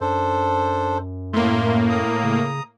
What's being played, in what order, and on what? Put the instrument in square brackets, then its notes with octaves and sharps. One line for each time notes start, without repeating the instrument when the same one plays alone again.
[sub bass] F#2 [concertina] D4 A4 C5
[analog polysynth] A2 A#3 [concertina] E5 C6
[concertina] A#5 D#6
[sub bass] C#3